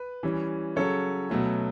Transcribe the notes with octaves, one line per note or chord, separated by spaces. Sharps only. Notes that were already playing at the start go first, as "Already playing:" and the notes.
Already playing: B4
E3 G3 C#4
C#3 F#3 C#4 A4 C#5
B2 F#3 A3 C#4